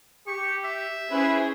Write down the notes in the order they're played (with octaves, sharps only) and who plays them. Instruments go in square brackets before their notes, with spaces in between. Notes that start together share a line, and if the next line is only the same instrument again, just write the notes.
[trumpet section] G4 [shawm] C#6
[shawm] E5
[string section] C#4 G#4 C5 [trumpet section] E4 B4